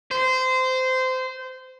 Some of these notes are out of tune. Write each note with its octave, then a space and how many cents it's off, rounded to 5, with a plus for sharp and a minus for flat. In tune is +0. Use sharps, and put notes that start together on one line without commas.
C5 -20